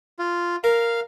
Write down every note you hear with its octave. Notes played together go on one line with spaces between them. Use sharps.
F4
A#4 F5